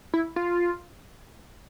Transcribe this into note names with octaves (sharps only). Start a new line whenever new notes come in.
E4
F4